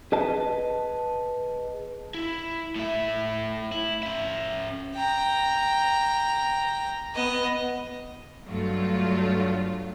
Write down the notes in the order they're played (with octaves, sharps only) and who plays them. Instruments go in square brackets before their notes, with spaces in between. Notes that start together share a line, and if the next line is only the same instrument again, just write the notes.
[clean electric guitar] G#4 B4 D#5 A5
[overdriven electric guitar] E4
A2 E5
E4
C#4 E5
[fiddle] G5 A#5
B3 D#5
[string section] G2 F#3 A3 F4